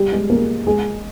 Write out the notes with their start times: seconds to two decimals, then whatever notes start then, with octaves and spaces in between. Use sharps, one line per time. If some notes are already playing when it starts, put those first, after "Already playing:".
Already playing: G3 G4
0.12 G#3 G#4
0.30 A#3 A#4
0.67 G#3 G#4